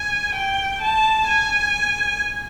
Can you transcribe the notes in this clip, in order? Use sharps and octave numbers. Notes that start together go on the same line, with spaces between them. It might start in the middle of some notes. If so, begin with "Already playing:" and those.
Already playing: G#5
G5
A5
G#5